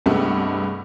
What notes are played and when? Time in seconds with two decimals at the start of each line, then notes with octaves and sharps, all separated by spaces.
0.06 C2 G2 C3 G#3 A3 B3